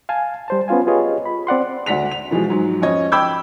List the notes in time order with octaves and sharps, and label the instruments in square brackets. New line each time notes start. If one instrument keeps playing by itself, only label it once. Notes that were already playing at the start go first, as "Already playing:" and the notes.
[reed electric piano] F5 G#5 A5
G3 C5 A5
B3 C#4 F4 F5 G#5
F4 G4 G#4 B4 C#5 D#5
B5
C4 D5 F#5 C6
[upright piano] D2 D5 F#5 B6 F7
F7
B2 E3 F3 G#3
G#2 F#3
F2 C#4 C#5 D#5 G#6
G5 B5 D6 E6 G6 G#6